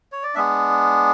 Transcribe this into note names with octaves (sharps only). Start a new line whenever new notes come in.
C#5
D5
G#3 B3 D4 E5